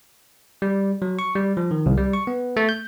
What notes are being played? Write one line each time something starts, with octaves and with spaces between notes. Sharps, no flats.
G3
F#3
C#6
G3
F3
D#3
C2
G3
C#6
B3
A3
G6